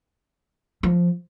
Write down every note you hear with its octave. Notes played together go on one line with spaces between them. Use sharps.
F3